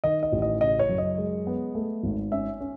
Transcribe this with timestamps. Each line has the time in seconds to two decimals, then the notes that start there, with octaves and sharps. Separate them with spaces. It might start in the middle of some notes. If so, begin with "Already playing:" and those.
0.04 D#3 D#5
0.23 D#5
0.32 A1
0.42 D#5
0.61 C#3 D#5
0.79 C#5
0.89 F#2
0.98 D#5
1.18 G#3
1.47 B3
1.75 A3
2.03 G#1
2.32 C#4 E5
2.60 C#4